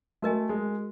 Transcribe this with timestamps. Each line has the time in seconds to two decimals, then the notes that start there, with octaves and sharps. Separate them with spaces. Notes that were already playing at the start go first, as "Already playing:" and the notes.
0.22 A3 F#4 A#4 D#5 G#5
0.49 G#3